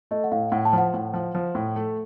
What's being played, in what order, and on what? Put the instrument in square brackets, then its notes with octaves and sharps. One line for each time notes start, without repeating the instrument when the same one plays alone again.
[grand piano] A3 [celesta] D#5
[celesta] F#5
[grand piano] A2 [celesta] F5
[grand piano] A2 [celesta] F#5
[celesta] A5
[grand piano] F3 [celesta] F#5
[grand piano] A2
F3
F3
A2
A3